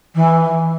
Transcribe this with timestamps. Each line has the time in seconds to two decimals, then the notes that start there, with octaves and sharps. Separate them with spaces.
0.15 E3